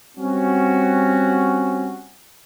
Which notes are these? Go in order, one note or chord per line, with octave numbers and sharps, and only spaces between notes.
G3 C4 C#4 F#4